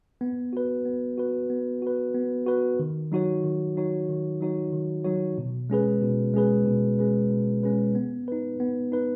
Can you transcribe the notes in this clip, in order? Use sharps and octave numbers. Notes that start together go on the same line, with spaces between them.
B3
F#4 B4
B3
F#4 B4
B3
F#4 B4
B3
F#4 B4
D#3
F#3 D#4 F#4 C#5
D#3
F#3 D#4 F#4 C#5
D#3
F#3 D#4 F#4 C#5
D#3
F#3 D#4 F#4 C#5
B2
G#3 C#4 G#4 B4
B2
G#3 C#4 G#4 B4
B2
G#3 C#4 G#4 B4
B2
G#3 C#4 G#4 B4
B3
D#4 B4
B3
D#4 B4